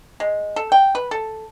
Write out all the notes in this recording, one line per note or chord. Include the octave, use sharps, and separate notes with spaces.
G#3
A4
G5
B4
A4